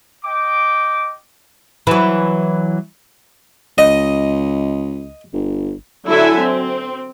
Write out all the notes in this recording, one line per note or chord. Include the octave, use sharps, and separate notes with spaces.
D#5 G5 D6
E3 F#3
C#2 D#5
G1
D3 F#3 E4 A4 E5 G#5
C4